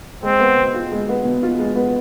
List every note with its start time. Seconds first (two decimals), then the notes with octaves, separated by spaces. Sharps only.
0.23 G#3 C4
0.40 B3
0.58 B2
0.74 F4
0.92 G#3
1.09 B3
1.25 B2
1.43 F4
1.59 G#3
1.76 B3